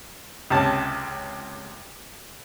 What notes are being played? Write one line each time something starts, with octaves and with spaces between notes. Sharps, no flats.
C#2 C3 C#4 A5